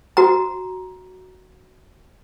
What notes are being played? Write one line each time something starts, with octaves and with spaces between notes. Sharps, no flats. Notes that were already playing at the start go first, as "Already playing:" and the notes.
F#4 A#5